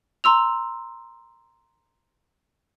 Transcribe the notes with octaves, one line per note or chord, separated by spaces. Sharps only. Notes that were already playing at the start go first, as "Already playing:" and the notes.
A#5 C6 E6 F7